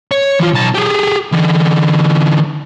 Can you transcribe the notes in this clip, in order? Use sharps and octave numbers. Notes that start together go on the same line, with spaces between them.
C#5
E3 F4
B1 A5
G4 G#4
D3 E3